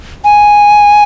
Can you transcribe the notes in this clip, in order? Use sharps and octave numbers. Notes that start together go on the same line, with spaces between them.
G#5